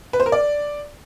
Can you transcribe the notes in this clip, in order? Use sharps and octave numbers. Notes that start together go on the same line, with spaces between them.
B4
C5
A#4
D5